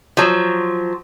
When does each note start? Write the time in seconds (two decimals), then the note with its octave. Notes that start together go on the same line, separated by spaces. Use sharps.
0.17 F3 F#3